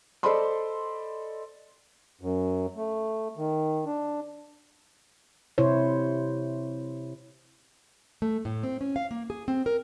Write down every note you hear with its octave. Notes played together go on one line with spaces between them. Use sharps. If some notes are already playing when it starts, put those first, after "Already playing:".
A4 C5 D5 D#5 B5 C6
F#2
A3
D#3
D4
C3 E4 C5 C#5
A3
A2
C4
C#4
F5
A#3
G#4
C4
A#4